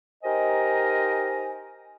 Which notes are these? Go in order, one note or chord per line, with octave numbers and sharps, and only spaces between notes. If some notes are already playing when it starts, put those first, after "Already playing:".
D#4 G4 A#4 C5 D#5 G#5